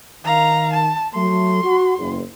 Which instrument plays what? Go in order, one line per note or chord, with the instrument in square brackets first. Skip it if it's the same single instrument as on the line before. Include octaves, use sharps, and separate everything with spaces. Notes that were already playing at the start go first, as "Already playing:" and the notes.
[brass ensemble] D#3 [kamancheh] F5 A#5
[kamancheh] A5
[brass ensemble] F#3 A3 [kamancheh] C6
[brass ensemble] F#4
F#1 E2